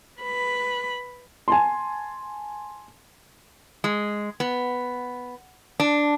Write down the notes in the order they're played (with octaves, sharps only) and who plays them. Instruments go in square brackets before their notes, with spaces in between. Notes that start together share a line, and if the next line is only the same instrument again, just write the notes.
[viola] B4 B5
[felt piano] G#5 A5 C6
[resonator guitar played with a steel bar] G#3
B3
D4